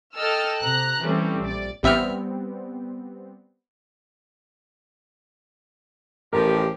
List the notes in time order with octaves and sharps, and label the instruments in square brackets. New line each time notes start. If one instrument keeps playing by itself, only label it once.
[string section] A4 D#5 G5 A5 E6 F6
C3 A#5 F#6
E3 G3 A3 C4 C#4
A#1 D5
[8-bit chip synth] A1 E5 F6 [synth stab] G3 B3 C4
[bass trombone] A1 [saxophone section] F3 G4 [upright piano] A#4